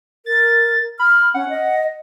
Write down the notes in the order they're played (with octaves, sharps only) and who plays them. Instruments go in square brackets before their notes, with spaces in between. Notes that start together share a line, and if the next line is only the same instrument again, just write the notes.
[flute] A#4 [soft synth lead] A6
[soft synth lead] B5 [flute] F6
[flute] C#4 [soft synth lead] F#5
[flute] D#5